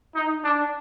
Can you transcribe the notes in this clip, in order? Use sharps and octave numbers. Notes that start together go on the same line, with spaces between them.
D#4
D4